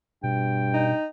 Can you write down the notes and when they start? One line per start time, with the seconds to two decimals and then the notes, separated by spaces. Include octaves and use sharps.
0.24 G2 B2 G5
0.74 D#4